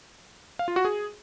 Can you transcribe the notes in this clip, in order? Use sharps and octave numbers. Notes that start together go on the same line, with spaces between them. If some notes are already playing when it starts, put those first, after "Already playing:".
F5
F4
F#4
G#4